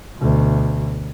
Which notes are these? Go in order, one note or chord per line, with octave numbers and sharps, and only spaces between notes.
D2 B2